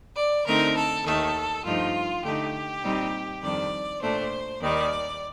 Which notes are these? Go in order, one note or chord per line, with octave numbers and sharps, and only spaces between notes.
D5
D3 A3 C4 D#4 A#4
A4
D#2 D#3 A3 A4
G2 F3 A3 D#4 F4
D3 A3 D#4 G4
A#2 G3 C4 D#4
F2 D#3 G3 D4 D5
A#2 A3 D4 C5
D#2 D#3 G3 D5